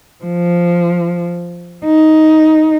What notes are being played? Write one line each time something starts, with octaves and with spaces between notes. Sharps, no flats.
F3
D#4